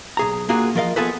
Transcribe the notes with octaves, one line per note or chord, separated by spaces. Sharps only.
B1 G#4 A#5
A#3 D4 F4 F#4 G#4
F3 F4 A#4 D#5 F5
B3 F4 G#4 A4 B4